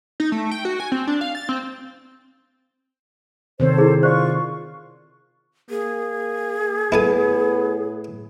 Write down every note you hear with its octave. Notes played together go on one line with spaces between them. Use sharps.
D#4
A3
G5
F#4
G#5
C4
D4
F5
A6
C4
C3 D#3 C4 A4 C5 C#5
E4 G#4
F4 C5 D5 C#6
A#3 G#4
A2 B3 E4 A4 G#5